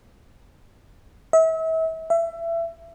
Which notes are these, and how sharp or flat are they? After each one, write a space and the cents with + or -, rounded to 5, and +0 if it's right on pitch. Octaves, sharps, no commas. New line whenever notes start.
E5 -35
E5 +25